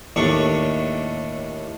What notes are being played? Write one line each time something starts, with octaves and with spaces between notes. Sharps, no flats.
D#2 A2 D4 C#6